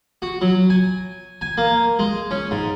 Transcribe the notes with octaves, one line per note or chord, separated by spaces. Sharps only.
F#4
F#3
G#5
G#5
A#3
G#3
C#4
G#2